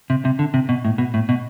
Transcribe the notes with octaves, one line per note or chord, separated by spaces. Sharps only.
C3
C3
D3
C3
B2
A2
B2
A2
B2